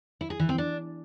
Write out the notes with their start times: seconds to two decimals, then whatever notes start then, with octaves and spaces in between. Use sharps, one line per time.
0.21 E4
0.30 G#4
0.39 E3
0.49 C4
0.58 D4